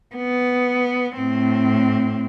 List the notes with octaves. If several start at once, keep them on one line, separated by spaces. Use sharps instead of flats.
B3
A2 C4